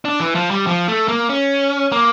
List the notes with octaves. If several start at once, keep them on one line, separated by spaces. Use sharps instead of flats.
D4
E3
F3
G3
F3
A3
A#3
C#4
A#3